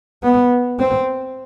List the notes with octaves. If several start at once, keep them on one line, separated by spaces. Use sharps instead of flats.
B3
C4